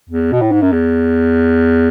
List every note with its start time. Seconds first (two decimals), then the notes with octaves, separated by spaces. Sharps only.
0.10 E2
0.32 B2
0.41 A2
0.52 G#2
0.62 F#2
0.72 E2